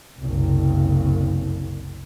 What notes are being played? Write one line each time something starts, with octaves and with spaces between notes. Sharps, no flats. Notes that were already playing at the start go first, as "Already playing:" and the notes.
F#1 C2